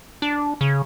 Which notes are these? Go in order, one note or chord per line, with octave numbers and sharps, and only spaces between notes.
D4
C#3